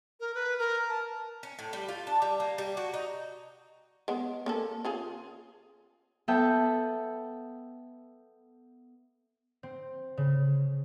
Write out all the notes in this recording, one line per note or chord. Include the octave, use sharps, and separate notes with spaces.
A#4
B4
A#4
A5
C#4
A2
G3
F4
D4
G3
A#3
G3
F#4
D#4
G#3 B3
A#3 C#4 A4
C#3 F4 G#4
B3 A4 E5 F#5 G5 A5
C4
C#3